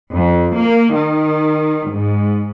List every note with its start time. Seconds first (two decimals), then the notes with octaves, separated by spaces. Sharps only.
0.13 F2
0.55 A#3
0.95 D#3
1.89 G#2